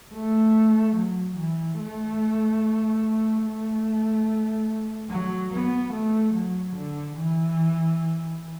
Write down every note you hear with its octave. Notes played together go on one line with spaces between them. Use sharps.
A3
F#3
E3
A3
A3
F#3
B3
A3
F#3
D3
E3